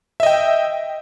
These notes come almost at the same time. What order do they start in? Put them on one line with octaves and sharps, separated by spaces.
E5 D#5 G5